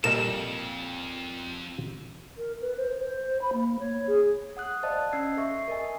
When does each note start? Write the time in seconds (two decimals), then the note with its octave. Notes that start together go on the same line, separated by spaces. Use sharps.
0.04 F2 A#2 G3 A4 A#4 D#5 E7
2.38 A#4
2.61 B4
2.77 C5
2.98 C5
3.41 B5
3.53 A#3
3.80 C#5
4.07 G#4
4.57 F#5 D#6 F#6
4.83 C5 D5 D#5 F5 A5
5.13 C#4 E6 G#6 C7
5.37 A4 E5 C#6 C7
5.68 A#4 D#5 G#5